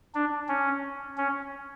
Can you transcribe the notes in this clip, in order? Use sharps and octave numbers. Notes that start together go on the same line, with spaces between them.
D4
C#4
C#4